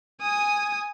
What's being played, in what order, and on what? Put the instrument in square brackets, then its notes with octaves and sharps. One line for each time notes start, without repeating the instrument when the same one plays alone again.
[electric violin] G#5 D#6